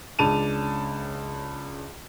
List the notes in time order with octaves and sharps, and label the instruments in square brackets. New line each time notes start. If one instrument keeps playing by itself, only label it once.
[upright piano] C#2 C#3 D4 A5 D#7 F7